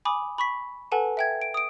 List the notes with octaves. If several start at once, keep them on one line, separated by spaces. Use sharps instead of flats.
G#5 B5 D6 D#6
B5 C#6 B6
A4 B4 F#5 G#5 A5
E5 G5 G#6
D7
D#6 D7